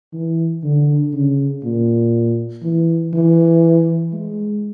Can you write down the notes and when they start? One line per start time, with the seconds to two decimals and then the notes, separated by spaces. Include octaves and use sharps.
0.13 E3
0.63 D3
1.13 C#3
1.64 A#2
2.63 E3
3.14 E3
4.13 G#3